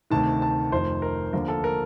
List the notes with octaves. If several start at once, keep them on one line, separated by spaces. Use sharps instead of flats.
D2 C3 D#3 A5
A5
F1 F2 D#3 C5
A#4
D#2 D3 F3 A#3 A#4
A4
A#4